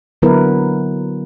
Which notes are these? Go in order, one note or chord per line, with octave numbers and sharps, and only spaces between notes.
D3 F#3 B3 E4 A#4 B4